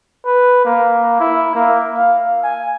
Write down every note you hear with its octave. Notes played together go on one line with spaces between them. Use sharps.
B4
A#3
E4
A#3
F5
G#5